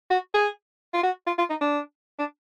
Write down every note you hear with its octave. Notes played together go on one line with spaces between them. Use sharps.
F#4
G#4
F4
F#4
F4
F4
D#4
D4
D4